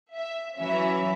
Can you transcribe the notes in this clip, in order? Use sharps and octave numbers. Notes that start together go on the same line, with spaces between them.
E5
E3 F#3 C#4 E5